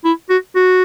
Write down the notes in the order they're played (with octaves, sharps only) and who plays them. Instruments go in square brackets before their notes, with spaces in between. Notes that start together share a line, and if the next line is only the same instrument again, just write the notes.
[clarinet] E4
F#4
F#4